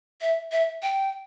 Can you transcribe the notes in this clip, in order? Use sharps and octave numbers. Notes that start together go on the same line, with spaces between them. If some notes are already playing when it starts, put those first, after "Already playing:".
E5
E5
G5